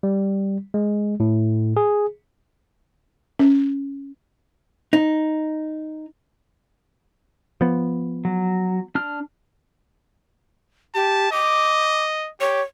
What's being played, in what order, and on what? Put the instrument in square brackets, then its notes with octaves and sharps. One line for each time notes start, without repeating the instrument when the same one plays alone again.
[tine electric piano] G3
G#3
A2
G#4
[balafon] C#4
[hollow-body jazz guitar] D#4
[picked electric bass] F3 B3
[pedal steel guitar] F#3
D4 F6
[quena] G4 [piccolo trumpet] A5
[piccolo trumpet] D#5 [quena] D6
[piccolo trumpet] G4 [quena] C#5